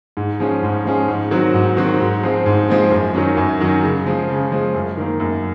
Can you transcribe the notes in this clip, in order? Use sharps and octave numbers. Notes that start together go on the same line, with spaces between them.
G#2
F3 G#3 C#4
G#2
F3 G#3 C#4
G#2
D#3 F#3 C4 F#4
G#2
D#3 F#3 C4 F#4
G#2
F3 G#3 C4
G#2
F3 G#3 C4
F#2
D#3 F#3 C#4
F#2
D#3 F#3 C#4
C#3
F3 G#3
C#3
F3 G#3
F#2
D#3 A#3
F#2